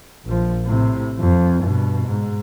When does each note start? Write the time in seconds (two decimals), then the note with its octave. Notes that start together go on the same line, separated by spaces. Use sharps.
0.25 A#1 F3
0.65 A2 C3
1.19 F2
1.62 G2 B2
2.06 G#2